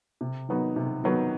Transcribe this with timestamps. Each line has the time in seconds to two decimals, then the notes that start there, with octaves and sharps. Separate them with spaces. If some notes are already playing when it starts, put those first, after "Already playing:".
0.21 C3
0.49 D#3 F#3 B3 D#4
0.76 C3
1.04 D#3 F#3 B3 D#4